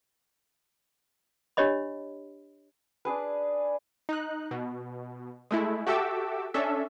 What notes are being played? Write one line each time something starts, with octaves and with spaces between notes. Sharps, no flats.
D4 G4 C#5 D#5 B5
D4 G#4 B4
D#4 F#6
B2
G#3 A3 E4
F#4 G4 A4 E5 D6 E6
C#4 D4 A4 E5